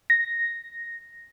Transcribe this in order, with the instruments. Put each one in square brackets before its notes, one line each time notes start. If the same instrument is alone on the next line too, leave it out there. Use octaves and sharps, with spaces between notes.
[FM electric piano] A#6